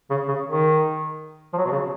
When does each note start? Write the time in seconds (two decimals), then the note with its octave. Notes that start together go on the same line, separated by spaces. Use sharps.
0.10 C#3
0.28 C#3
0.46 D#3
1.53 F3
1.57 F#3
1.65 B2
1.72 C#3